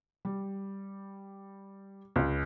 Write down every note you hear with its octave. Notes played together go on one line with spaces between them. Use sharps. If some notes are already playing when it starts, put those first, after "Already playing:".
G3
C#2